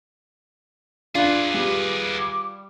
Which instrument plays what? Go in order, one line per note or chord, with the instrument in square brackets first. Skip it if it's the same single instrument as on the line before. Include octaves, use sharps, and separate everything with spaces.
[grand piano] D4 [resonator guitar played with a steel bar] F4 [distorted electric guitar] G#4 B4
[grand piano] G3 [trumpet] D6